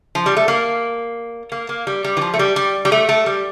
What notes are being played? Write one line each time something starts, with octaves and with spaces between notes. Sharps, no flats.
F3
G3
A3
A#3
A#3
A#3
G3
G3
E3
F3
A3
G3
G3
G3
A3
A3
G3